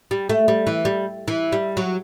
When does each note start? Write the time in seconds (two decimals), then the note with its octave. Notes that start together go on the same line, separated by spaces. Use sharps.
0.11 G3
0.29 A3
0.48 G3
0.67 E3
0.85 G3
1.28 E3
1.52 G3
1.77 F#3